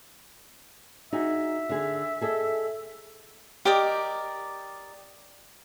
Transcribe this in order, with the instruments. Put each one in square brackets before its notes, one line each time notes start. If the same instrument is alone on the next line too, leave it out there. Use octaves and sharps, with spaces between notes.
[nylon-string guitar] D#4 F#4 G#4 [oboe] E5
[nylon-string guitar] D3 G#4
G#4 A4 D#5
[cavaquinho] G4 A#4 D5 D#5